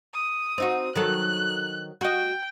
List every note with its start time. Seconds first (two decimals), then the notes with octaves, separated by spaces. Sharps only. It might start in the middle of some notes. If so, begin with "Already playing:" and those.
0.14 D#6
0.58 C4 D#4 F#4
0.96 D#3 F#3 A4 F#6
2.01 F#4 D#5 G5